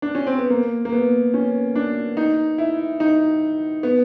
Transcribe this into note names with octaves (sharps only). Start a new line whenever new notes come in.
D4
C#4
C4
B3
A#3
A#3
B3
C#4
D4
D#4
E4
D#4
B3